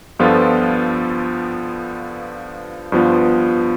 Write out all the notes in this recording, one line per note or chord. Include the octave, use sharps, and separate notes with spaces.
G2 F3 B3 F4 A4
G2 F3 B3 F4